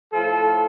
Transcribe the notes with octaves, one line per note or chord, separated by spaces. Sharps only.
A2 F3 A4